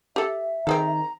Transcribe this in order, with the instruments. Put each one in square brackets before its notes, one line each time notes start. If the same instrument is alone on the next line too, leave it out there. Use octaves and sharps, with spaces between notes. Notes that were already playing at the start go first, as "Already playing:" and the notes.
[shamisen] G4 A4 [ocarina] E5
[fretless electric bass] D#3 [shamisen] C4 G#4 A4 [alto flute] A#5